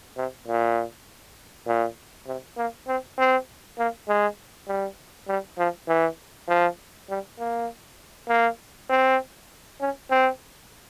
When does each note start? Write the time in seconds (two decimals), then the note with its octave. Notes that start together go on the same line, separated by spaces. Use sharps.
0.17 C3
0.47 A#2
1.67 A#2
2.27 C3
2.57 A#3
2.88 C4
3.18 C4
3.79 A#3
4.08 G#3
4.68 G3
5.28 G3
5.58 F3
5.88 E3
6.48 F3
7.10 G3
7.40 A#3
8.29 A#3
8.90 C4
9.80 C#4
10.10 C4